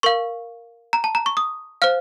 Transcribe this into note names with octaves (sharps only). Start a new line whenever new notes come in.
A#4 F5 C#6
A#5
A5
A#5
C#6
D#6
C5 F5 F6